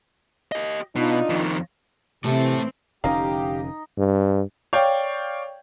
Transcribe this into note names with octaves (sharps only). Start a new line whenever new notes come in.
G4 D#5
B2 D4 D#4 F4
F2 D#3
A2 C3 E3 A3 C4 A4
F1 D3 C#4 D#4 G4 D#5 F5
G2
C#5 D5 F5 G5